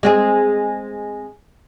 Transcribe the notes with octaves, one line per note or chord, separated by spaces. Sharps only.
G#3 C4 G#4